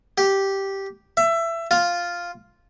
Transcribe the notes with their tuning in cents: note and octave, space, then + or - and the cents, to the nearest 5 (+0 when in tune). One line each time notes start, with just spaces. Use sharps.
G4 -5
E5 +20
F4 +0